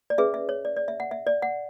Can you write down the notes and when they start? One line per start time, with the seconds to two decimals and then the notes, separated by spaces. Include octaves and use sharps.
0.10 D5
0.18 C#4 G#4 B4 E5
0.34 E5
0.49 C#5
0.65 D5
0.76 D5
0.88 E5
1.00 F#5
1.11 E5
1.27 D5
1.42 F#5